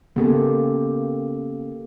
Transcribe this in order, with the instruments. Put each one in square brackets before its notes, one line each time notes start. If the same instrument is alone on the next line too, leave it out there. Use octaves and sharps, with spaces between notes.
[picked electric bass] C#3 B3 C#4 [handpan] A#3 G4 A4